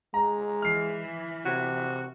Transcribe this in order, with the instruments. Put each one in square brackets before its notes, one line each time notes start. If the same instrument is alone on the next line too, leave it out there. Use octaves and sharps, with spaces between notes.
[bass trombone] G#3 [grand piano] A#5
[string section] E3 [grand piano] F6 C7
[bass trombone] C3 [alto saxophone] F#4